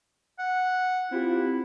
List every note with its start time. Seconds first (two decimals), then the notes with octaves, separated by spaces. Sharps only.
0.39 F#5
1.11 C4 E4 F4 G4